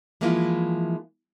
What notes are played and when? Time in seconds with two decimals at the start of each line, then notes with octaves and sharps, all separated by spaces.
0.21 E3 F3 G#3 A#3 E4 F4